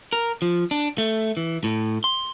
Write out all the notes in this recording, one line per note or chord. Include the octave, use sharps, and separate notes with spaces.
A#4
F3
D4
A3
E3
A2
C6